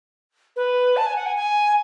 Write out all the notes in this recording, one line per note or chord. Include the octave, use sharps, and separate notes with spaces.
B4
A5
G#5
F#5
G#5
G#5